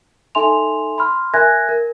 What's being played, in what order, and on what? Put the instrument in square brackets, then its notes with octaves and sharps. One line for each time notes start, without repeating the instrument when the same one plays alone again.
[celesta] D#4 A4 E5 G#5 C6 F7
B5 C6 F6
A#4 E5 G#5 F#6 G#6 A#6
A#4